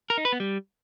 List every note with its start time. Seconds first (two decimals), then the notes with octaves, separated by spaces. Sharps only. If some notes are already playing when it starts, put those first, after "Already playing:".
0.10 A#4
0.18 D#4
0.25 B4
0.32 B3
0.40 G3